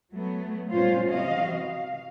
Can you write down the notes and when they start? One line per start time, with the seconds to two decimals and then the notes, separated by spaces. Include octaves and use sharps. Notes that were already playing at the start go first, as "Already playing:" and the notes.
0.12 F#3 A3 B3
0.70 A#2 G3 C#4 F4 C5 F5
1.08 C3 E3 F#4 D#5 F5
1.59 F5